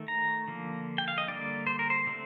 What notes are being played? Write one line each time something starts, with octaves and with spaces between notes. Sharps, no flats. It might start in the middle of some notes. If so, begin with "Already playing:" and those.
Already playing: D#3 A3
A#5
D3 F3 A#3
G5
F5
D#5
D3 G3 A#3 D5
C5
A#4
C5
D3 A3 C4